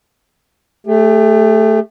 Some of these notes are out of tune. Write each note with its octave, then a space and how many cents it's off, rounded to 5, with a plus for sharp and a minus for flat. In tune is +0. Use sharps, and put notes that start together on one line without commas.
A3 +0 G4 +40